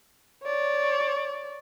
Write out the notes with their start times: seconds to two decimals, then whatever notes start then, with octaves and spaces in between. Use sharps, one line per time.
0.44 C#5 D5